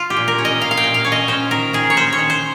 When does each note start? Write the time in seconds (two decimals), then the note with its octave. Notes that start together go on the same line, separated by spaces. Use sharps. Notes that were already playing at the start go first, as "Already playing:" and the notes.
Already playing: F4
0.10 G4
0.17 A#2
0.28 A#4
0.38 C#4
0.45 D#5
0.61 A#2 F5
0.71 F5
0.77 G5
0.84 A#2
0.94 F5
1.04 C#4 C#5
1.12 D#5
1.28 C#4 C5
1.51 D#3 A#4
1.73 D#3 G#4
1.90 C#5
1.97 C#4 C5
2.13 C#5
2.19 D#3
2.30 C5